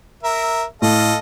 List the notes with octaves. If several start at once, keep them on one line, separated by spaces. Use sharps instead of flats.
A#4 E5
A2 A4 D#5 F5